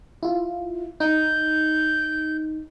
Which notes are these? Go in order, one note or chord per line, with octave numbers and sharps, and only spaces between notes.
E4 F4
D#4 G6